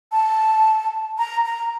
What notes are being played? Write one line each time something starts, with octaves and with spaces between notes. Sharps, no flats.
A5
A#5
A#5